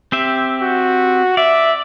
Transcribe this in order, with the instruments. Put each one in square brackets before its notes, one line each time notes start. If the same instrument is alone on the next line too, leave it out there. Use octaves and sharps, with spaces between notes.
[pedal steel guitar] C4 G4 E5
[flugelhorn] F#4
[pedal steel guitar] D5 [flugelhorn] E5